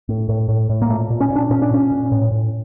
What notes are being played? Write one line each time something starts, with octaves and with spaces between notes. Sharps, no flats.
A2
A2
A2
A2
A#3
A#2 A3
A#2
C#4
A#2
D4
A#2 C#4
D4
A#2 C#4
A#2
A2
A2